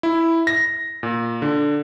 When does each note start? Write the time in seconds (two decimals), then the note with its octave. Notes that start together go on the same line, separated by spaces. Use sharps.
0.03 E4
0.47 A#6
1.03 A#2
1.42 D3